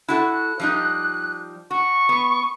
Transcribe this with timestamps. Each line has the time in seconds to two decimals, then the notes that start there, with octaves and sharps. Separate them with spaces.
0.08 E4 F#4 A4 F#6
0.60 F3 G3 D#4
1.71 F#4 C#6
2.09 B3